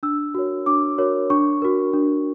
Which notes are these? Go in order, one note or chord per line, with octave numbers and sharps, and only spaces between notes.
D4 E6
F#4 A#4 C#5
D4 D6
F#4 A#4 C#5
D4 C#6
F#4 A#4
D4